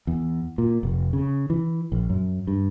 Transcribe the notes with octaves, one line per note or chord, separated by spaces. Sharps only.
E2
A#2
F1
C#3
E3
A#1
F#2
G2